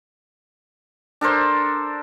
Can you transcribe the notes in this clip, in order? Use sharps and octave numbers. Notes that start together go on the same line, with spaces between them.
D4 A4 A#4 C5